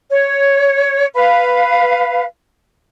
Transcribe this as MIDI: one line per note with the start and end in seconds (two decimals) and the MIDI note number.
0.10 1.06 73
1.15 2.23 71
1.15 2.23 77